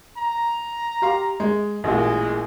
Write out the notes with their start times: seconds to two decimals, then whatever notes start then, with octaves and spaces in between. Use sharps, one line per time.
0.17 A#5
1.02 G4 F5 C6
1.40 G#3
1.84 A1 A#2 G#3